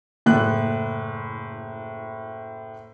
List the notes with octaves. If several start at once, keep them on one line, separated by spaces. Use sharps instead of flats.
F#1 A2 F#6